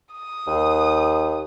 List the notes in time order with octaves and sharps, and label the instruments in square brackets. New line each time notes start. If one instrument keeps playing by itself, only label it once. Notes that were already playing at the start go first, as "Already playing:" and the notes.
[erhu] D#6
[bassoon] D#2